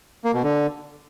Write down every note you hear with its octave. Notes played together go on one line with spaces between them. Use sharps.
A#3
B2
D3